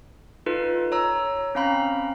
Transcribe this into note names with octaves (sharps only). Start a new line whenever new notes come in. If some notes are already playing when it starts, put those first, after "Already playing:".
D#4 F4 A4 B4
C#5 A#5 E6
C4 C#4 F5 A#5 B5